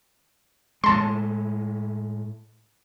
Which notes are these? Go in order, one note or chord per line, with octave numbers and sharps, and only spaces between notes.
A2 G#3 A5 C6